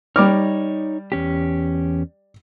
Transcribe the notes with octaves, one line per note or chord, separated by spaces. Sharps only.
G3 D#4 C#5 D6 F6
E2 C#4 G4